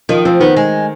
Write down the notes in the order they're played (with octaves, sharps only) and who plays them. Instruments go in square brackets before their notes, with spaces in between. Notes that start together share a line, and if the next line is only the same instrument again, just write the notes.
[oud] D#3 [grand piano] F3
[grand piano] F3 [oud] C4
[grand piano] D#3 [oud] B3
[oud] G#3